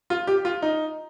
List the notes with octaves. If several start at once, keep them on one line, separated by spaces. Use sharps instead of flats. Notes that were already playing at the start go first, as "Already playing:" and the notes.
F4
G4
F4
D#4